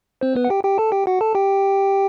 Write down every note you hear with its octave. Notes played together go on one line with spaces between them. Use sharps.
C4 C5
B3 B4
F#5
G4 G5
G4 G5
A4 A5
G4 G5
F#4 F#5
A4 A5
G4 G5